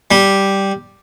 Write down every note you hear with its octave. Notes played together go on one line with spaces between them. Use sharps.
G3